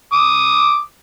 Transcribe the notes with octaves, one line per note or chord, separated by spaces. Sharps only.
D6 D#6